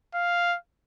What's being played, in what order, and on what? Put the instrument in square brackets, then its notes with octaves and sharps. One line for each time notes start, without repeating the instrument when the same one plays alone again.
[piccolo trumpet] F5